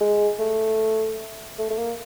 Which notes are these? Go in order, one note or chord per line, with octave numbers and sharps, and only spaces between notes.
G#3
A3
A3
A3
A#3